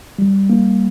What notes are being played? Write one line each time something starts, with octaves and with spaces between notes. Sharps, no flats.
G3
A#3